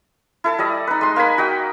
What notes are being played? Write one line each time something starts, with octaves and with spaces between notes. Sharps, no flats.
E4 A4 A5
G3 D5 D#5
D#4 B4
G#3 C6
A#3 G#5 B5
F#4 D#5 G5